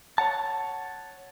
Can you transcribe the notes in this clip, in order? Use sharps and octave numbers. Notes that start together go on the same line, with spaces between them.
C#5 F#5 A5